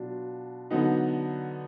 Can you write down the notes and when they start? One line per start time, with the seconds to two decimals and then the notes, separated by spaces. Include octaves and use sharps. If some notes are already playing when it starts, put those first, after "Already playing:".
Already playing: B2 F#3 D4 F4
0.71 D3 F#3 B3 D#4